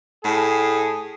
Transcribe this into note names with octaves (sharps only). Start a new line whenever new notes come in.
A2 G#4